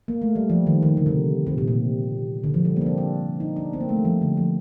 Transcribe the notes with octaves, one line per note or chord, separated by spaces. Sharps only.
A#3
A3
G3
F3
D#3
D#3
D3
C3
C3
A#2
C3
D3
F3
G3
A#3
D4
C4
D4
D#4
D4
C4
A#3
A3
G3
F3
D3
F3